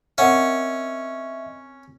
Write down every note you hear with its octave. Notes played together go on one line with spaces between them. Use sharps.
C4 C#4 A#4 D#5 E5 F#5